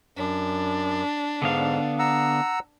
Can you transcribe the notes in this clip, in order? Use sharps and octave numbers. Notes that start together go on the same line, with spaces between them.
F#2 D4
G#2 D3 B3 F5
F#5 A#5 E6